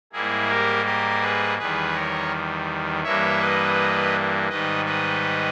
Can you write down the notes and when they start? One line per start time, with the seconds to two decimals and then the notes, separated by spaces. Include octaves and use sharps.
0.13 G#2 G3 A#3 E4 G#4
0.49 G4 A#4
0.85 G4 A#4
1.22 G#4 B4
1.58 E2 D#3 G3 G#4 B4
1.94 A#4 C#5
3.03 G2 E3 G3 A#3 C#5 E5
3.40 B4 D#5
4.49 G#2 D#3 G3 B4 D#5
4.85 B4 D#5